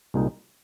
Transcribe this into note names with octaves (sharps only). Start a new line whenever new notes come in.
C2 A#2 G#3 D#4